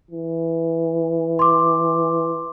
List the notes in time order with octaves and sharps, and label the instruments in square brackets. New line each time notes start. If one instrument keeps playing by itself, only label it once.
[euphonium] E3
[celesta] C6 D6